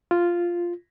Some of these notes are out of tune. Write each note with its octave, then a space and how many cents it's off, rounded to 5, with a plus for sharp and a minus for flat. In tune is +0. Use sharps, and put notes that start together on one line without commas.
F4 -5